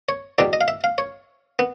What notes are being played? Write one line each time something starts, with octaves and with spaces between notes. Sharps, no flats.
C#5
E2 B2 G3 D5
D#5
F5
E5
F5
C#5
B3